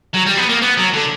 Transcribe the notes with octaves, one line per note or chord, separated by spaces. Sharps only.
F#3
G3
B3
A#3
B3
F#3
D3